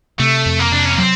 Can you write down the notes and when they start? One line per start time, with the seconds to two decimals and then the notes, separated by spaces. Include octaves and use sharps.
0.19 C3 A3
0.46 F2
0.59 A#3
0.72 C3 D4
0.85 C#4
0.98 F#3 C4